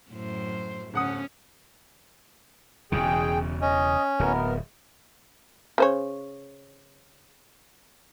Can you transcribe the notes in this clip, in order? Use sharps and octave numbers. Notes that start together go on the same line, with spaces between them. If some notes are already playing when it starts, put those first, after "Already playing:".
F#2 A2 C5
D1 C#4 F#5 D#6
E1 E2 C#3 G#4 G5
C#4 D#5
D1 B3 A#4
C#3 C5 C#5